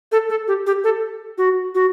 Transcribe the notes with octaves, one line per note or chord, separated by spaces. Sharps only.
A4
A4
G4
G4
A4
F#4
F#4